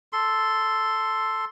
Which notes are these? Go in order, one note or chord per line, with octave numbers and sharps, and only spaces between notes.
A4 C6